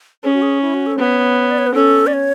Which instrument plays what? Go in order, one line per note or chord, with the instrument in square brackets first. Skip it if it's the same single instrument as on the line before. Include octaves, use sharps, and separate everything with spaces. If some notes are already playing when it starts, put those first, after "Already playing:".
[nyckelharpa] C#4 [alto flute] G#4
[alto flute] F#4
G#4
E4
F#4
A4
[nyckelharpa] B3 [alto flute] C#5
[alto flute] D5
C#5
B4
[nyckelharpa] C#4 [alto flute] A4
[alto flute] D5
C#5